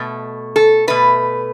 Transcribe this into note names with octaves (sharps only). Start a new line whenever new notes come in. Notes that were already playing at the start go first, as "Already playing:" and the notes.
Already playing: B2 A3
A4
B2 A3 B4